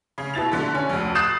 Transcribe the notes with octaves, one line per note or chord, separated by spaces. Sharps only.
C#3
B2 E4 A6 F7
D3 A3
C#4
F1 D2
D#6 F#6 A6 C7 E7